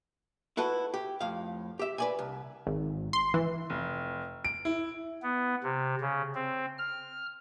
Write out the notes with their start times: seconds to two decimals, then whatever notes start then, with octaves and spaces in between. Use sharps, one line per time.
0.57 E4 F#4 A4 B4
0.94 G4
1.20 F2 A2 F5
1.79 G4 E5
1.98 B4 D5 G#5
2.19 C2
2.67 G#1
3.13 C6
3.34 E3
3.70 F1
4.45 D7
4.65 E4
5.23 B3
5.63 C3
6.01 C#3
6.35 C4
6.79 F6